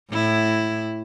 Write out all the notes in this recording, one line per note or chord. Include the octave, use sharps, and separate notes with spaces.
A2 E4